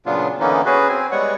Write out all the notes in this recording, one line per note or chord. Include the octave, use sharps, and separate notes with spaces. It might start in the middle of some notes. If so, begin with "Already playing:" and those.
A#2 C#3 F#3 B3 D4 F4
D3 E3 A#3 B3 C#4 D#4
C#4 F#4 G#4 B4
C4 G#5
G3 G#3 B3 C#5 F#5